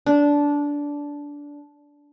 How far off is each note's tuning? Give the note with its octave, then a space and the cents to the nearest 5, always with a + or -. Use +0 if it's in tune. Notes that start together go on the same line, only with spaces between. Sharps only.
D4 -15